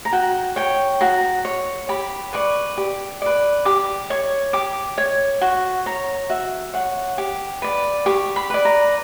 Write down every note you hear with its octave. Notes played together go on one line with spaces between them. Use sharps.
A#5
F#4 G5
C#5 G5
F#4 A#5
C#5
G4 B5
B4 D5 C#6
G4
B4 D5
G4 D6
C#5 C#6
G4 D6
C#5
F#4 C#6
C#5 A#5
F#4 E5
C#5 F#5
G4
B4 D5
G4 C#6
B5
B4 D5
A#5